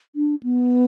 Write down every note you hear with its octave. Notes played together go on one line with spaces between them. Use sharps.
D4
B3